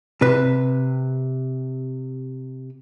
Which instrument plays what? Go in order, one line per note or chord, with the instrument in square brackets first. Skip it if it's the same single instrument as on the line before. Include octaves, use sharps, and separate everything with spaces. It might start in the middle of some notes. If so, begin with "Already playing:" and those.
[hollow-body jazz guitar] C3 B4